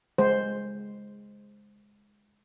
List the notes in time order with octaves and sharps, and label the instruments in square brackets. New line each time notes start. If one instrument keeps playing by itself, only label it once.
[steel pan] G#3 C5